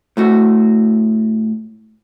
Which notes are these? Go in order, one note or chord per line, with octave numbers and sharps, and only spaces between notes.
A2 A3 F#4